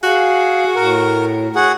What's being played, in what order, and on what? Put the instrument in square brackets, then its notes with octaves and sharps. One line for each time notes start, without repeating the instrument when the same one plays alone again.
[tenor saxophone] F#4 [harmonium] G#4 F5 G#5
[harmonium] A2 [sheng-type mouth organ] A#4
[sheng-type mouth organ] F#4 G#4 F#5